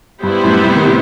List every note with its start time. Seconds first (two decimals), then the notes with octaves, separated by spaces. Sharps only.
0.23 G2 G3 B3 E4 G4 C5
0.43 F#2 A2
0.64 A2 C3
0.75 D#3
0.86 A2 C3